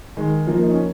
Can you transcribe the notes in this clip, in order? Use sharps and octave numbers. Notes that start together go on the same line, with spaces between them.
D#3 G#3
F3 A#3
D#4
C#4